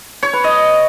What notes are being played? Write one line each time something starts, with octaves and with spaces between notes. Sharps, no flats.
C#5
B4
D#5